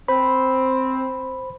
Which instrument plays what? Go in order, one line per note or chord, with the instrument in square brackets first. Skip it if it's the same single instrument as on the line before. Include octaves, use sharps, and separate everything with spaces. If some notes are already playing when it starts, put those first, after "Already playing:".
[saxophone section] C4 [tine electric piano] C5 B5